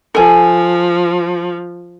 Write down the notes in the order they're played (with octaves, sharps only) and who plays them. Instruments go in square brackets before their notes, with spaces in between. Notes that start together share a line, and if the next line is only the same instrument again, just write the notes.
[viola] F3 [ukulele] A4 G#5